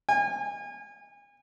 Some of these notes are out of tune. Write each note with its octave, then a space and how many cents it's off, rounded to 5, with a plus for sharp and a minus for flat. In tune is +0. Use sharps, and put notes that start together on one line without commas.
G#5 -35